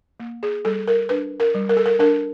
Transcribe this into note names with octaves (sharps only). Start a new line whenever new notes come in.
A#3
G#4
G3 A4
A#4
D4 B4
A#4
G3
A#4
A4
A#4
D4 A#4